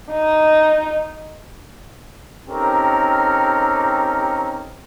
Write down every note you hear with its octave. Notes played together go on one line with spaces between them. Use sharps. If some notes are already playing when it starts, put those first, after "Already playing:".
D#4
C4 C#4 D#4 G4 A4 A#4